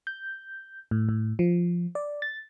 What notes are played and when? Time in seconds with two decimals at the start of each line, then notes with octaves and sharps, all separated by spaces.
0.07 G6
0.91 A2
1.09 A2
1.39 F3
1.95 D5
2.22 A6